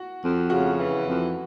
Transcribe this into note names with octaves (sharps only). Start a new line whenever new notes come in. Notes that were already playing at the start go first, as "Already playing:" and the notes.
Already playing: F#4
F2
C#3 F#4
E3
F2